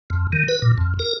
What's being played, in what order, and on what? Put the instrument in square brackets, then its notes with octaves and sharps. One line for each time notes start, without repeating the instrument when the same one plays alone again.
[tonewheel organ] F2
D#3
B4
A#2
F2
A#4